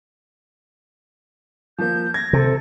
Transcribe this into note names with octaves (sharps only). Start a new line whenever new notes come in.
F3 A#3 G6
G#6 A#6
C3 A4